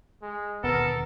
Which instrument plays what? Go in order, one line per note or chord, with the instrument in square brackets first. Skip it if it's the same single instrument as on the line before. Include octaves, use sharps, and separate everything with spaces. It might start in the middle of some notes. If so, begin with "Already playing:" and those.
[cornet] G#3
[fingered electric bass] D#2 B2 D3 [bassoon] B3 [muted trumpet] A4 [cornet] A#4